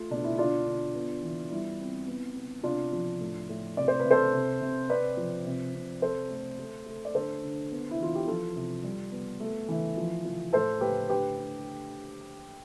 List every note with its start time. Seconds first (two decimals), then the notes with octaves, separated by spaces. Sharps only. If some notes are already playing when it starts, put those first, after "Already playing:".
Already playing: A3 F4
0.10 B2 D4
0.24 E4
0.38 D3 D4 F4
0.67 D3
0.95 B3
1.23 E3
1.51 G3 E4
1.80 C4
2.07 B3
2.36 B3
2.63 C3 D4 F4
2.92 F3
3.21 A2
3.49 A2
3.77 C3 D5
3.88 C5
4.00 C3 B4
4.11 A4 C5
4.33 C3
4.61 C3
4.90 C4 B4 D5
5.17 F3
5.46 C3
5.74 C3
6.02 C4 A4 C5
6.31 A3
6.59 A3
6.86 A3
7.05 D5
7.15 D3 A4 C5
7.43 D3
7.72 B3
7.91 E4
8.00 E3 F4
8.15 G4
8.27 F3 F4 A4
8.56 C3
8.84 G3
9.12 B3
9.40 A3
9.69 E3
9.97 F3
10.25 F3
10.53 A2 A4 C5
10.81 A2 G4 B4
11.09 D3 G4 B4
11.38 D3